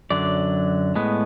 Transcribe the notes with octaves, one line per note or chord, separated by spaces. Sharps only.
F#2 D3 F#3 D5
A2 G#3 B3